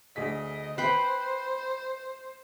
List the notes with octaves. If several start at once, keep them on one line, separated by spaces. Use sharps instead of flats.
D2 G#4 D#5 B6
B4 C5 G5 C7